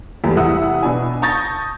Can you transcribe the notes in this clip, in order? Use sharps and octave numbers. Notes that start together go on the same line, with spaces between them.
E2 E3 G3 A3
C2 E3 E5 F#5 D#6 E6
B2 D4 G#5
A5 C#6 D#6 G6 A6 A#6